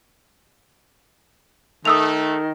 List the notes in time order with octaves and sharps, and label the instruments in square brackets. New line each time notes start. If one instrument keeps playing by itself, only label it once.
[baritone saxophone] D#3 [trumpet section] A3 [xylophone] D#6 E6 F7